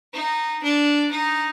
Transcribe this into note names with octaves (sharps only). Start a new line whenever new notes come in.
D#4
D4
D#4